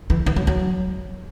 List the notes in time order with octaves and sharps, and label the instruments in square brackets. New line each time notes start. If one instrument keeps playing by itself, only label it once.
[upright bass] E3
E3
F#3
F#3